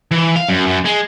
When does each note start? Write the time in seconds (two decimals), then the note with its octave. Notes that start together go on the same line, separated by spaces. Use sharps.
0.11 E3
0.36 F5
0.49 F#2
0.66 F#2
0.85 G#3